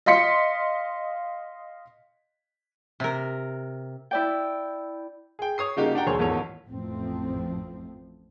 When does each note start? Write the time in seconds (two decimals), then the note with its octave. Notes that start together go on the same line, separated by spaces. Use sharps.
0.06 D#5 F5 C6 B6 C#7
3.00 C3 A#4
4.11 E4 D5 G5
5.39 G#4 G5
5.58 C#5 D#6 C7
5.77 C#3 G3 A#3 D#4 F#4 G4
5.95 D4 F#4 F#5 G5 A#5
6.07 E1 D#2 G#4 C5 C#5
6.18 D#1 E2 G#2 A4 C#5
6.68 A1 F2 A2 F3 A3 C4